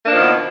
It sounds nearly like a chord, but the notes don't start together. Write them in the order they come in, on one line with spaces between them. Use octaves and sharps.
A#3 D4 F3 D#3 B2